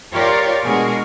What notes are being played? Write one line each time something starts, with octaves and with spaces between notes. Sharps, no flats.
F4 G4 A#4 C#5 D5
B2 G#3 D4 F#4 G#4 A#4